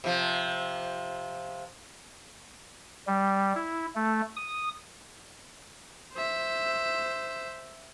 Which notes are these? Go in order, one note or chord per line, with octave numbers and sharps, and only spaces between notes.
C3 F3
G3
E4
A3
D#6
C5 E5